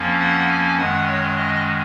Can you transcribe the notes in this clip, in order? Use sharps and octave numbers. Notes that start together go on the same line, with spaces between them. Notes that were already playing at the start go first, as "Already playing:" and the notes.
Already playing: F2 F3 A#3 C#4
F#5
G#5
F#2 D#3 G#3 F#5
C#5
D#5